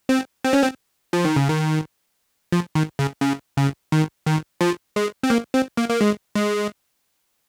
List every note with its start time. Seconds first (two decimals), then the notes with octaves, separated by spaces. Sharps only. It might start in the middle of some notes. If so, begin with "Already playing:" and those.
0.09 C4
0.45 C4
0.53 C#4
0.62 C4
1.13 F3
1.25 D#3
1.36 C#3
1.48 D#3
2.52 F3
2.75 D#3
2.99 C#3
3.22 C#3
3.57 C#3
3.92 D#3
4.26 D#3
4.61 F3
4.96 G#3
5.23 C4
5.30 A#3
5.54 C4
5.77 A#3
5.89 A#3
6.01 G#3
6.36 G#3